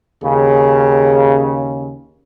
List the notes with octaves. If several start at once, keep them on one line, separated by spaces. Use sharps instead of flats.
D#2 C#3